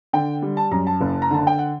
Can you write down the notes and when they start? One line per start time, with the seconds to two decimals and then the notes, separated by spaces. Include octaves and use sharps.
0.13 D3 G5
0.42 G3
0.57 A5
0.71 F#2 A#5
0.87 A5
1.01 F#1
1.22 A#5
1.31 D3 A5
1.47 G5
1.59 F#5